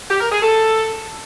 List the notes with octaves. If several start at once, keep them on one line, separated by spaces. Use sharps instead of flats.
G4
A#4
G#4
A4